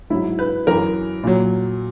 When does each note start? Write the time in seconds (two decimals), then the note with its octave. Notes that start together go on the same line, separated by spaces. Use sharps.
0.10 G#2 F#3 E4
0.39 B4
0.67 F#2 E3 A#4
1.23 A#2 F#3